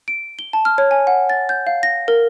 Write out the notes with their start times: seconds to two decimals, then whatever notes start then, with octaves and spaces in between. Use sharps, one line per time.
0.08 D7
0.39 G7
0.53 A5
0.65 F6
0.78 C#5
0.91 G#5
1.07 F#5
1.30 A6
1.49 G6
1.67 F5
1.83 A#6
2.08 A#4